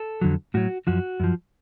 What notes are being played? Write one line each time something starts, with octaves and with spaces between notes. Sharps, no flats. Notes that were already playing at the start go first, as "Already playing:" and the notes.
Already playing: A4
F2 D3 F#3
A2 F#3 F#4
F#2 F3 F#4
F#2 F3